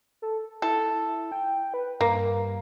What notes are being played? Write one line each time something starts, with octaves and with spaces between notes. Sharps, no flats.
A4
E4 A4
G5
B4
G2 A#3